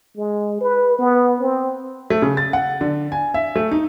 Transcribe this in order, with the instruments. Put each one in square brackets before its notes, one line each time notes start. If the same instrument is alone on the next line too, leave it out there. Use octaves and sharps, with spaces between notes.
[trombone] G#3
B4
B3
C4
[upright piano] A3
C#3
A6
F#5
D3
G#5
E5
A3
D#4